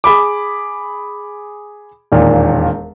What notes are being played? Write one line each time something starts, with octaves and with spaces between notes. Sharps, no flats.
G#4 B5 D6
E1 D#2 A#2